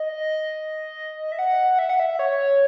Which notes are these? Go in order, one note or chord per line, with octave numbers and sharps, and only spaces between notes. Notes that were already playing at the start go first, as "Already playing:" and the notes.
Already playing: D#5
E5
F#5
E5
F#5
E5
C#5